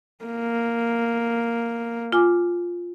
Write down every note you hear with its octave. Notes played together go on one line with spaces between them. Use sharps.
A#3
F4 G#5 D6